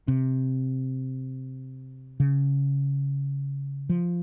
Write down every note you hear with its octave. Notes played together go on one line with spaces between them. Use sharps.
C3
C#3
F3